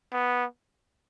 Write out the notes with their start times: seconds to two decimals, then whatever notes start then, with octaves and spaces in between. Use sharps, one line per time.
0.13 B3